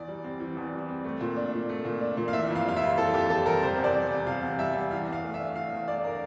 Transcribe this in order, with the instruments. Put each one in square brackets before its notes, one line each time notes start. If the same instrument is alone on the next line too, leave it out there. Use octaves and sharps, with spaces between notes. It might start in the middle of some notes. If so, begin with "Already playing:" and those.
Already playing: [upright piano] E2 E3 D5
G3
C4
E3
E2
G3
C4
A3
A#2
D4
A#2
A3
A#2
D4
A#2
F5
E3 E5
F2
F5
G3 F5
E5
F2
E3 A4
F2 G4
G3 A4
F2 A#4
C3 C5
E2
D5
G3
E2
C3 F5
E2
G3 E5
E2
E3 F5
E2
F5
A3
E5
D4
E3 F5
E2
A3 D5
D4 A#4